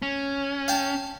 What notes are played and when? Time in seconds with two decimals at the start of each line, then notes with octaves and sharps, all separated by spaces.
0.02 C#4
0.68 F5 G5 A5